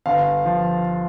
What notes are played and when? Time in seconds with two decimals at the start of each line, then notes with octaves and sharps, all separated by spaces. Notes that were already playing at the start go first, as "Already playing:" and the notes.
0.06 G1 F5
0.45 F3